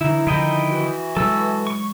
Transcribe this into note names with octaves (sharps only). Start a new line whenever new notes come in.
D3 E3 D#4 E4
D3 D#3 F3 E4 D#5 G5
E3 F#4
F#3 G#3 A4 E6
C#6